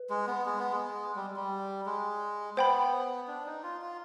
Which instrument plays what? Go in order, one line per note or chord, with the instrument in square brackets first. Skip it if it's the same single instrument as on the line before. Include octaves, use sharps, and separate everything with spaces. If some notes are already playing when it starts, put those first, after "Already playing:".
Already playing: [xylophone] B4
[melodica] G#3
B3
G#3
B3
G#3
G3
G3
G#3
[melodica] B3 [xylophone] C5 G5 B5
[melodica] D4
D#4
F4
F4